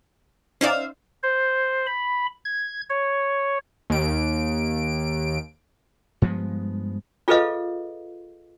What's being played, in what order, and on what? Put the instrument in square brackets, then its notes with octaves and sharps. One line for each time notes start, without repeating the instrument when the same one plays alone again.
[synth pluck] C#4 D#4 D5 [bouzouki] C5 E5 F5
[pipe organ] C5
B5
G#6
C#5
[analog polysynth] D#2 D7
[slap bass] G2 F3 G#3 B3
[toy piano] F4 G#4 A4 B4 D#5 F5